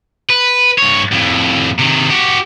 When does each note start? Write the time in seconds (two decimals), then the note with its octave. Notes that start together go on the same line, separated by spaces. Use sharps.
0.29 B4
0.78 G2 C#5
1.12 F2 A2
1.79 C3 D#3
2.10 F#4 G4